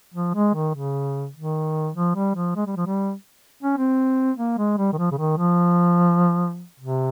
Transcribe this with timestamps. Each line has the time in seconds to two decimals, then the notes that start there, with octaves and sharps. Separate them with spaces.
0.14 F3
0.34 G#3
0.54 D#3
0.75 C#3
1.35 D#3
1.95 F3
2.16 G3
2.36 F3
2.56 G#3
2.66 G3
2.76 F3
2.86 G3
3.63 C#4
3.77 C4
4.37 A#3
4.58 G#3
4.78 G3
4.93 D#3
4.98 F3
5.12 C#3
5.18 D#3
5.38 F3
6.80 C3